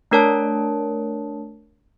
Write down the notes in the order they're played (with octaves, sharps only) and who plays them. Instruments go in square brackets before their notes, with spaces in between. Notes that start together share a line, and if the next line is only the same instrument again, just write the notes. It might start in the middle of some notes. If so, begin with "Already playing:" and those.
[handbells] A3 D4 A#4 C#5 A5